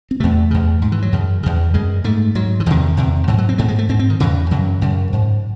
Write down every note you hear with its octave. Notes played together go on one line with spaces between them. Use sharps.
C4
E2 C3 A3
E2 C#3
G#2
E3
F#3
F#2 C#3
E2 C#3
F#2 C#3 G#3
G#2 A3
G#2 F#3
E3
E2 C3 D#3
E2 C3
G#2 E3
F#3
C4
G#2 A3
G#3
A3
G#2 C4
C4
D#3
E2 C#3 E3
F#2 C#3 F#3
F#2 C#3
G#2